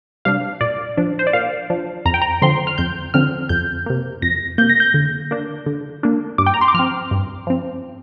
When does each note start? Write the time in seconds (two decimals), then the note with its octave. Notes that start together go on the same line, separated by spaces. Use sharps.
0.25 C3 G3 D4 F5
0.61 A#2 D5
0.97 F3 D4
1.19 C5
1.27 D5
1.33 A#2 F5
1.70 F3 D4
2.05 F2 A#5
2.14 G5
2.22 A#5
2.42 D3 F3 C4 C6
2.67 F6
2.78 F2 G6
3.14 D3 F3 C4 F6
3.49 F2 G6
3.86 C3 A#3
4.22 F2 A#6
4.58 C3 A#3 G6
4.69 A#6
4.80 G6
4.94 D3
5.31 A#3 D4
5.66 D3
6.03 A#3 D4
6.38 G2 D6
6.46 G5
6.54 A#5
6.61 C6
6.68 D6
6.74 F3 C4 F6
7.11 G2
7.47 F3 C4